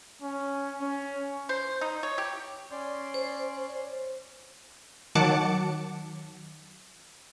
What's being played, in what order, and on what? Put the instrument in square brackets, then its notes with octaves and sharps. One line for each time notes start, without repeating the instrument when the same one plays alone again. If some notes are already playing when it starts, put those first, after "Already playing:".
[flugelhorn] C#4
C#4
[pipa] C5
D#4
C#5
G4
[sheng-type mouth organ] C#4 D5 C6
[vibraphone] C5
[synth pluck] D#3 F#3 F#5 A5 D6 C#7